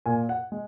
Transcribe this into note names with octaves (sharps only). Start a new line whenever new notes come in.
A#2 G#5
F#5
G#3